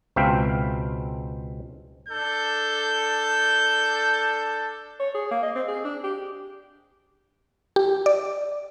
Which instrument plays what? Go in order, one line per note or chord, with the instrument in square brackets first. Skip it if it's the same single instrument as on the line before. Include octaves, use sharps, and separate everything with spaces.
[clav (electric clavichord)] C#2 B2 C4 E5 F5 G5
[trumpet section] D4 A4 [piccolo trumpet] G6
[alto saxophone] C#5
G#4
A#3
D#5
C4
G#4
D4
G4
[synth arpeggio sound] G4
D5